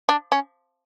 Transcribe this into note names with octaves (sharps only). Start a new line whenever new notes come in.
D4
C#4